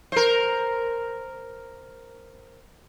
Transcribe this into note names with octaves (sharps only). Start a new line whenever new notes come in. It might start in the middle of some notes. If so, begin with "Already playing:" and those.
A#4 C5